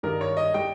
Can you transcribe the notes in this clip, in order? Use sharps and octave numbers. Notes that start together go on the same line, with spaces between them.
G2 D#3 G3 A#4
C#5
D#5
G3 G5